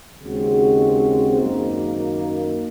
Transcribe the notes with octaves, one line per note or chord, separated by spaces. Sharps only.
D#2 C#3 G#3 C4 F#4
F#2 D#3 A#3